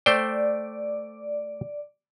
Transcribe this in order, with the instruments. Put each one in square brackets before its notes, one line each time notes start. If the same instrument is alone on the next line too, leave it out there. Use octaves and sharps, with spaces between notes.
[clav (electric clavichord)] A3 C5 G5 [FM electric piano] D5